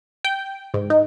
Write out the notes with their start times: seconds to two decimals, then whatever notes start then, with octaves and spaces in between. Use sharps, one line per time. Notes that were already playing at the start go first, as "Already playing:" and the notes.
0.25 G5
0.74 G#2
0.90 D#4